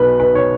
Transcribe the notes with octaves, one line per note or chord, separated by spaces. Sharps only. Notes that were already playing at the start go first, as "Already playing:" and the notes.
Already playing: B1 B2 B4
B4
C#5